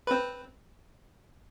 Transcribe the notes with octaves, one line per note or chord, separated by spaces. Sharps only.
C4 B4